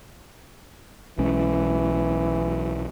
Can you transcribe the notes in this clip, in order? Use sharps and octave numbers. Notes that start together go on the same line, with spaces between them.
B1 E3 G#3 C#4